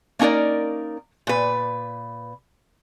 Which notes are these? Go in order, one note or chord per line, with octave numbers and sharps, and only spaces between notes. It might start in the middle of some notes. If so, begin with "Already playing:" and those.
A#3 C#4 D#4 A#4 D5
A#2 B4